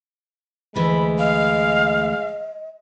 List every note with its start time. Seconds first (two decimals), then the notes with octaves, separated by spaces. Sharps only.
0.76 D2 E3 G#3 A3 B5
1.19 D#5 F5